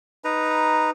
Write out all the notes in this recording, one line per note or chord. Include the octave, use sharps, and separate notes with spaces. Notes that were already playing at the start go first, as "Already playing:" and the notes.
D#4 B4 A#5